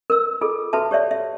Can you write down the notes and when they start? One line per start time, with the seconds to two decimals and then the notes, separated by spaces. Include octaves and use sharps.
0.10 A#4 B4 E6
0.41 F4 G#4 A4
0.73 F#4 A4 B4 E5 A5
0.91 G4 C#5 D5 E5
1.11 E5